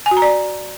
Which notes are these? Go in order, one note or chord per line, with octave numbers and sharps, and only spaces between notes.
G#5
F#4
A#5
D5